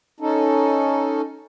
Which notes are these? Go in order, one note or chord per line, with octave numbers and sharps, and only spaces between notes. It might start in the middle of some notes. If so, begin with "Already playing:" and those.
C#4 D#4 A4